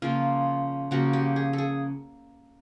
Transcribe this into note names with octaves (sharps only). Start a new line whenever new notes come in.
C#3 F3 A#3 F4
C#3 F3 A#3 F#4
G4
G#4
A4
G#4